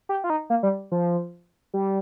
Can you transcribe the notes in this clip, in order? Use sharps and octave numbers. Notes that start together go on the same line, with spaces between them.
G4
F4
D#4
A#3
G3
F3
G3